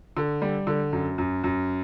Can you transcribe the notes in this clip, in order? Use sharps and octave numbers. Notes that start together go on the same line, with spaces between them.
D3
G3
D3
F#2
F#2
F#2